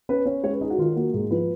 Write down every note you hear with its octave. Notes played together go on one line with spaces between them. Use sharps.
C#4 B4
C#4 C#5
G#3 C#5
B4
D#4 G#4
F#4
D#3 F4
A#3 F#4
G#2 G#4
F3 B4